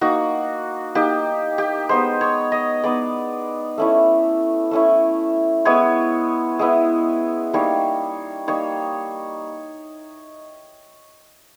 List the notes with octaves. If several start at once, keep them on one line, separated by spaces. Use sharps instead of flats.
A#3 D#4 F#4
A#3 D#4 G4
G4
G#3 B3 D#4 C5
C#5
D#5
G#3 B3 D#4 D5
A3 C#4 E4
A3 C#4 E4
G#3 B3 E4 C#5
G#3 B3 E4
G3 A#3 D#4 C#5
G3 A#3 D#4 C#5